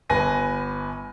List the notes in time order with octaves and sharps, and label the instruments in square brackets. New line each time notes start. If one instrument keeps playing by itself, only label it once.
[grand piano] G1 B4 G#5 A#6 D#7